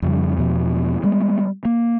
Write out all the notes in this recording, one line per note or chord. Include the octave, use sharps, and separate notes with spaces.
F2 C#3 G3
E2 B2 F3
G3 G#3 B3
A#3